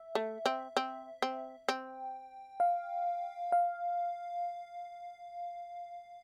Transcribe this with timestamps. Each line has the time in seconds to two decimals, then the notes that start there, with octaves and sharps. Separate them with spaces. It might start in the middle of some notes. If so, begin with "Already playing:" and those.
Already playing: E5
0.15 A3
0.46 C4
0.77 C4
1.22 C4
1.69 C4 G5
2.60 F5
3.52 F5